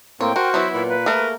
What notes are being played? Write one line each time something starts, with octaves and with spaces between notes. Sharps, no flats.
A2 A#3 C4 C#5 G5
F#4 A#4 C5
E3 F#3 B3 E4
A#2 B5
A#3 B4
A3 G#4 A#4